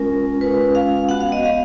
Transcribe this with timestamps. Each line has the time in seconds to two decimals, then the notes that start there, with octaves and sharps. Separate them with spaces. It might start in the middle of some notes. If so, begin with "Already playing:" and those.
Already playing: G#3 C#4 F4 A#4
0.41 G#3 C#4 F4 B4
0.75 F5
1.09 B3 F#4 F#5
1.20 F5
1.32 D#5
1.45 F5